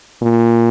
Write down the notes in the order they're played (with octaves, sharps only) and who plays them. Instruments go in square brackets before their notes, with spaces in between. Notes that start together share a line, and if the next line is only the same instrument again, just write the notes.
[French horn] A#2